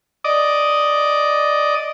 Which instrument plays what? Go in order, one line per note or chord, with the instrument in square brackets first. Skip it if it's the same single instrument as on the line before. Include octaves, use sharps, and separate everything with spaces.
[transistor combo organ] D5 D#5